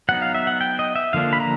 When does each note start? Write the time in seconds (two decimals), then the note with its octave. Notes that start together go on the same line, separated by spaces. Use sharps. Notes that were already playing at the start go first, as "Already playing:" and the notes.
0.09 F#3 B3 D#4 F#5
0.22 F5
0.35 E5
0.47 F#5
0.61 G5
0.79 D#5
0.96 E5
1.13 D3 F3 A#3 D4 F5
1.33 B5
1.40 A#5